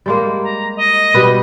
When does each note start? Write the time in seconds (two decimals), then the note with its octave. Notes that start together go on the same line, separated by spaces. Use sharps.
0.06 G3 G#3 A#3
0.43 A#5
0.76 D#5
1.14 B2 G3 B4